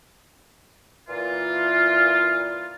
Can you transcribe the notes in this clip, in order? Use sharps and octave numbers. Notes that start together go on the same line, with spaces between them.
A#2 E3 F4